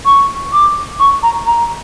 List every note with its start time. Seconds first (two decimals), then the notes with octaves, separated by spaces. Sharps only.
0.05 C#6
0.52 D6
0.99 C#6
1.23 A#5
1.47 A#5